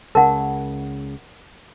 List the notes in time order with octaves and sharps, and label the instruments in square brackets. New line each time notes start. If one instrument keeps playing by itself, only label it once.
[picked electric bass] C#2 C#3 [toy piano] A#4 F#5 [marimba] A5